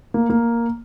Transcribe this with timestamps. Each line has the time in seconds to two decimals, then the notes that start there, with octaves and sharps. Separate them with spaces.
0.14 A#3
0.30 A#3